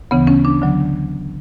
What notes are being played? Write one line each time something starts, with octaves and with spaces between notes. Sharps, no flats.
D2 C#3 E3 B3
C#4
D4
D3 F#3